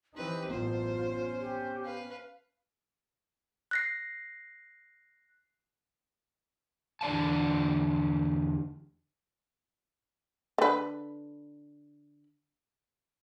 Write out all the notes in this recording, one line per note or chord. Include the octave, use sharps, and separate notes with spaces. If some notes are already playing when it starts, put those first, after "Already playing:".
E3 C4 D#4 G4 B4
A1 F#2 B3 F4 C5
C#4
G4
B4 F5
F#6 A#6 C7
E2 D3 D5 F5 A5
D3 B4